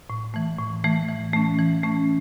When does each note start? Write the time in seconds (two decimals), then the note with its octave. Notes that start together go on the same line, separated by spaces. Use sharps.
0.10 A2
0.34 E3 A3
0.58 A2
0.84 E3 A3
1.08 E3
1.33 A3 C#4
1.59 E3
1.83 A3 C#4